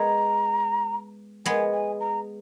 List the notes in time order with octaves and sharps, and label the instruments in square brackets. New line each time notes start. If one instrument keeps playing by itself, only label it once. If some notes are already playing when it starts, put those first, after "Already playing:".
Already playing: [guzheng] G#3 B3 [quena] A#5
[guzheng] G#3 B3 [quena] G#5
[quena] G#5
A#5